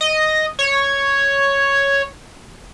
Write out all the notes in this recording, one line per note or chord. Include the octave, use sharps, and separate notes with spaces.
D#5
C#5